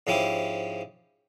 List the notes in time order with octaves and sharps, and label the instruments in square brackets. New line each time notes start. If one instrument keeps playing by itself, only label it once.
[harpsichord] G#2 F3 C#4 E4 G4